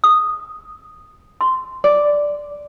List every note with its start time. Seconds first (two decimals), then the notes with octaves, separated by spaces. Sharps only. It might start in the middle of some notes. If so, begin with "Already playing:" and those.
0.04 D#6
1.41 C6
1.84 D5